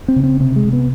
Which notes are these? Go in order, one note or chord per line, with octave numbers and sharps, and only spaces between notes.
C4
C#3
C4
C3 C4
G#3
C3
B3